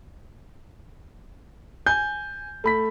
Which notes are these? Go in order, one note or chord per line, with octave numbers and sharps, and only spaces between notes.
G#5 G6
A3 B5 B6